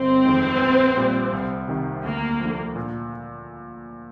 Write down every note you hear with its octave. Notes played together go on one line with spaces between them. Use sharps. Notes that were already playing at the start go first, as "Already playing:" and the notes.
Already playing: G1 C4
F2 D#3 G#3
A#1
A#2 G3
C2
C3 D#3
D2 A#3
F3
D3
A#2